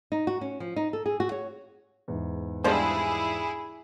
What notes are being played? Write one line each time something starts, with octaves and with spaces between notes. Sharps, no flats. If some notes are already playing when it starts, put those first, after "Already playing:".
D#4
F#4
C#4
F3
D#4
A4
G#4
F#4
C#5
E2 G#2
F3 G3 G#3 D4 E4 G#4 C5